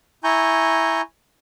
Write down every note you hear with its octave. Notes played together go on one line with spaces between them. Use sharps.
E4 G#5 A#5 C#6 G6